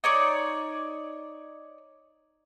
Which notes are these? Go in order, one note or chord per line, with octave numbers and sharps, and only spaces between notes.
D#4 C#5 D5